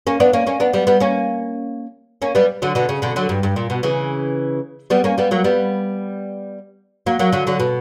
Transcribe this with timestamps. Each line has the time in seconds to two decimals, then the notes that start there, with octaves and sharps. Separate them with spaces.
0.07 A#3 C#4
0.20 B3 D4
0.33 A#3 C#4
0.46 A#3 C#4
0.60 B3 D4
0.73 G3 B3
0.87 G3 B3
1.00 A#3 C#4
2.22 A#3 C#4
2.35 G3 B3
2.62 D3 F#3
2.75 B2 D3
2.89 C#3
3.02 B2 D3
3.16 D3 F#3
3.29 G2
3.43 G2
3.56 A#2
3.70 B2
3.83 C#3 E3
4.90 G3 B3
5.04 A#3 C#4
5.18 G3 B3
5.31 F#3 A#3
5.44 G3 B3
7.06 F#3 A#3
7.19 F#3 A#3
7.32 D3 F#3
7.47 D3 F#3
7.60 B2